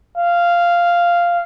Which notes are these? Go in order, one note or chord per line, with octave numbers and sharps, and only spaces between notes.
F5